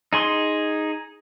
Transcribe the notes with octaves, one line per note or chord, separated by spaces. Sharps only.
D#4 G#4 C6